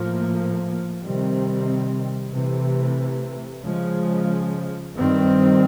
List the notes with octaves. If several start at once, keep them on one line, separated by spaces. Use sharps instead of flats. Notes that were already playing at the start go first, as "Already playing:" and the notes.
Already playing: A2 F3 A#3
C3 D#3 G3 C4
C3 E3 A3
C#3 F3 G#3
G2 D#3 G3 C4